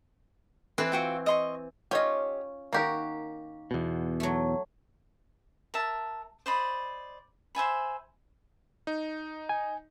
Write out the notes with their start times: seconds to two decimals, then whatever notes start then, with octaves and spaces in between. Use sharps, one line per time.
0.78 E3 C4 B4
0.92 F4 F#4 G5
1.26 D#5 C6 C#6
1.91 C#4 F4 G4 C#5 D#5
2.73 D#3 A#3 F#4 G4 A#4
3.71 E2 B2
4.20 F#3 A3
5.74 A#4 E5 A5
6.46 C5 D5 D#5 B5
7.55 C5 E5 G#5 B5
8.87 D#4
9.49 G#5